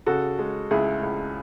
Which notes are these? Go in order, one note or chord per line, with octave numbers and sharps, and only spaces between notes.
C#3 F#4 A4
G#3
C#2 E4 G#4
C#2